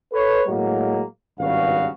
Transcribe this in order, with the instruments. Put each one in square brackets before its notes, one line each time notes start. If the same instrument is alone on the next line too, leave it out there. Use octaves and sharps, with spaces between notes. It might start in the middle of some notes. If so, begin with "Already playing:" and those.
[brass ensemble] A4 B4 C#5
A2 F#3 G#3 A#3
G#1 C#2 G2 C#3 F#4 F5